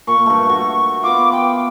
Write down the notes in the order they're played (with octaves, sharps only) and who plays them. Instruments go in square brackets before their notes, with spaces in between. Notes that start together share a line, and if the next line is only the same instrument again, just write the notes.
[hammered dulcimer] A#2 [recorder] C#6
[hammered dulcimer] G2 A3
A3 F#4
[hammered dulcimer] B3 F4 [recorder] D6
[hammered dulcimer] B4 [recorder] G5